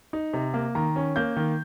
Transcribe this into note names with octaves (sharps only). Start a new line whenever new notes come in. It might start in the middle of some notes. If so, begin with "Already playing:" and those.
D#4
C3
A#3
D#3 A#5
C#4
A#3 G6
D#3